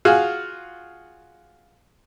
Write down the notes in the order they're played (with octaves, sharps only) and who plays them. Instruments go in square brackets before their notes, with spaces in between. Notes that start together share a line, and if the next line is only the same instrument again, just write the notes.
[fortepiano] F4 F#4 G#4 F5